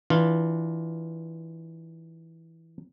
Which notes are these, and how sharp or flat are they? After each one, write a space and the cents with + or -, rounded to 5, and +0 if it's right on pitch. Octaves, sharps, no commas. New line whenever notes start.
E3 -10 D4 +10 F4 +0